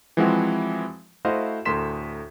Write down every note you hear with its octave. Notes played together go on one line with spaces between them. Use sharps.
E3 F3 G#3 C4 E4 F#4
A3 E4 F#4 C5 D#5 F5
D2 A2 A#4 C6 B6 E7